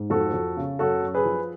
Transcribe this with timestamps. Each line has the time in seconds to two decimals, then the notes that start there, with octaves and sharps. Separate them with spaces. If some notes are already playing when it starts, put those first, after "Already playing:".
Already playing: G#2
0.10 F2 F#4 A4
0.33 F2
0.57 C#3
0.79 F#2 F#4 A4
1.03 F#2
1.14 G#4 B4
1.25 F3